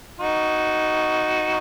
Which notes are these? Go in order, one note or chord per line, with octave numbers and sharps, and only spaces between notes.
D#4 F#4